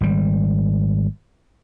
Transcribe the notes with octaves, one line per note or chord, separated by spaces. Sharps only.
G#1 G3